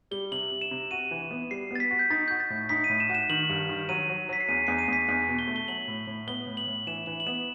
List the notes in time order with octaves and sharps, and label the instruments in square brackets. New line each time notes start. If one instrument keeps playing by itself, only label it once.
[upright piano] G3 [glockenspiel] G7
[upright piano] C3 [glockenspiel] F#7
[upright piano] C3
[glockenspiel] E7
[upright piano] C3
[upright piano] F#4 [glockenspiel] D#7
[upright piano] E3
B3
[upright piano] G3 [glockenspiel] C7
[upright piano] B3 [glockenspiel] A6
[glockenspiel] B6
[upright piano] F#4
[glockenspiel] G6
[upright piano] D#4 [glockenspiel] A6
[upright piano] F#4 [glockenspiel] G6
[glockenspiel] A6
[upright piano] A2
[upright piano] D#4 [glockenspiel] B6
[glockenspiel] D#7
[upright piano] A2
[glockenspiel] E7
[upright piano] F#4
[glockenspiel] E7
[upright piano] D#3 [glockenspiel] F#7
[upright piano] G2
D#3
[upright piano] F#3 [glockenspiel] D#7
[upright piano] F#3
[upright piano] F#3 [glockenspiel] B6
[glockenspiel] C7
[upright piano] E2 [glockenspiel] D#7
[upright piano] E2 [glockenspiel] C7
[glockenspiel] D#7
[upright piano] E2 [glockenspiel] B6
[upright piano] E2
B2
[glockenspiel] G7
[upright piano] A3
[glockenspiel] G7
[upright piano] F#3 [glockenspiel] F#7
[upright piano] A2
A2
[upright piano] B3 [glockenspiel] G7
[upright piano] A2
[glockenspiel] F#7
[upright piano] A2
[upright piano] E3 [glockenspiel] E7
[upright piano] E3 [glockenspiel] F#7
[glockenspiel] F#7
[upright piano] B3 [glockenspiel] E7